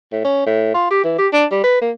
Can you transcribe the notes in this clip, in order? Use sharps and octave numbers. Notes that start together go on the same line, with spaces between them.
A2
C#4
A2
F4
G4
E3
G4
D4
G3
B4
A#3